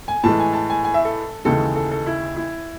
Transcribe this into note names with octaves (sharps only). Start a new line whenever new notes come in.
G#5
A2 E3 G#3 A5
G#5
A5
G#5
G#5
E5
A4
D#2 C#3 E3 G#3 A4
A4
A4
E4
E4